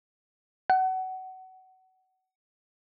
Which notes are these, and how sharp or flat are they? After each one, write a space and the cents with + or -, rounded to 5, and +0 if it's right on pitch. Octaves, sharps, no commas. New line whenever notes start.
F#5 +25